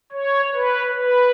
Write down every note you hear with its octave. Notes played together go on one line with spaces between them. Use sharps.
C#5
B4
B4